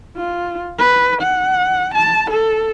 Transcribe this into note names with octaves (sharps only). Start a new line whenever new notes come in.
F4
B4
F#5
A5
A4